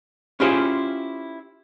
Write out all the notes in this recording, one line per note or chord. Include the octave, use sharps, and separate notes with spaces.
C#4 E4 F4 G4 G#4 C5